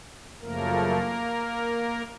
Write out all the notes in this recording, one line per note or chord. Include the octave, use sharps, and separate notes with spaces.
F#2 C#3 F3 A3 A#3 A#4